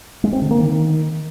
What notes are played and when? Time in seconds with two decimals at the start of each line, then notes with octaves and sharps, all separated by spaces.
0.24 G#3
0.33 C4
0.42 D3
0.51 A#3
0.60 D#3